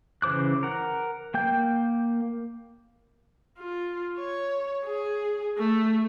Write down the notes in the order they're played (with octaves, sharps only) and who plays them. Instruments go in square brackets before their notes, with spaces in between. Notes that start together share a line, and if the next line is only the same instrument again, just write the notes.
[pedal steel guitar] C#3 E3 C5 D6 F#6
A#4 F#5
A#3 G5 G6
[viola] F4
C#5
G#4
A3